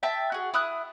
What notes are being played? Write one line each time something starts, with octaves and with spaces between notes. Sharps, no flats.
E5 G5 A5 E6
F#4 G#4
E4 D#6 F#6